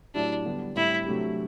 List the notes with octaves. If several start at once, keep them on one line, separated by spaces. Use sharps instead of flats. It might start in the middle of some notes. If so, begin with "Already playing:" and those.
A2 F#3 A3 D4 E4 G4
D3 G3 B3 D4
A2 G3 C4 E4
C3 F#3 A3 D4 G4